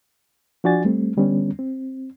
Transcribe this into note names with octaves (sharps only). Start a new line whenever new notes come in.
F3 D4 F#4 D5 G#5 A6
G3 A3 C4
D3 G3 B3 C#4
C4